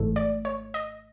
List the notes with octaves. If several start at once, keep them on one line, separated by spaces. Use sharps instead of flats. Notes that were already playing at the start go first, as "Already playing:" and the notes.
Already playing: G#1 G#2 E3 A3
D5
C#5
D#5